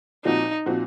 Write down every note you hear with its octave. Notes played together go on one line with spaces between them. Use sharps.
A#2 F3 C4 D#4 F#4
A#2 F3 C4 F#4